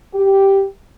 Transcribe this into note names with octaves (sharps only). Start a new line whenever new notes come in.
G4